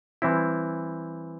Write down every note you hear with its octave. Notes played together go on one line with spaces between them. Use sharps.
E3 G3 C4 E4